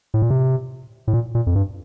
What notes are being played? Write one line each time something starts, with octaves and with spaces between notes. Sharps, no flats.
A2
A#2
C3
A2
A#2
A#2
F2
G2